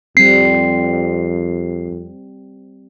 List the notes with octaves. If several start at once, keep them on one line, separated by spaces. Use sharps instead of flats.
F2 G3 C4 C7